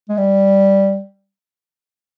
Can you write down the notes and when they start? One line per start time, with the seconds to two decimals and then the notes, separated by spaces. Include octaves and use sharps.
0.09 G#3
0.18 G3